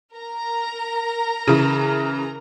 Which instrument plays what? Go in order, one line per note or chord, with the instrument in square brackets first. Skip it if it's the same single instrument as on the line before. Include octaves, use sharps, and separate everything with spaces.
[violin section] A#4 A#5
[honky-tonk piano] C#3 E3